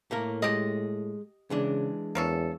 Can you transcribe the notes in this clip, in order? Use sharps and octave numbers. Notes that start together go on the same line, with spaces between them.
A2 A3 A#3 A#4
G#3 G4 A4 D#5
C#3 E3 G#3 D4
E2 A#3 C#4 A4